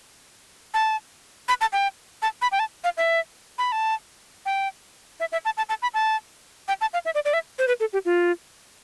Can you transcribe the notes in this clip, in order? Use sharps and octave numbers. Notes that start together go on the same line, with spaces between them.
A5
B5
A5
G5
A5
B5
G5
A5
F5
E5
B5
A5
G5
E5
E5
A5
A5
A5
B5
A5
G5
A5
F5
E5
D5
D5
E5
C5
B4
A4
G4
F4